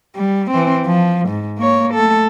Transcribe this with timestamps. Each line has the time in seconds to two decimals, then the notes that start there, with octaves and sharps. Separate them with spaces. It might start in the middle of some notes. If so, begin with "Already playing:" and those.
0.16 G3
0.51 E3 C4
0.85 F3
1.29 G#2
1.58 A#3 C#5
1.94 A3 A4